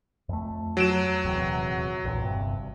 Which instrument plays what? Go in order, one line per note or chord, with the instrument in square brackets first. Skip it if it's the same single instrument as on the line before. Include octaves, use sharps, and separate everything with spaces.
[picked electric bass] F2 A3
[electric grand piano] F#3 D7 E7
[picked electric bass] D#1 E2 C3
A#1 E2 A#2
G1 G2 C3